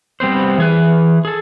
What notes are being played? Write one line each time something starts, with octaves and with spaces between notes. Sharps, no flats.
G3 B3 C4 C5
E3 G#4 B4
G#4 A4